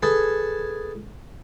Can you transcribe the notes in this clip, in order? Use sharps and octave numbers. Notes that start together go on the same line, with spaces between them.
G#4 A4 B4 G#5 A5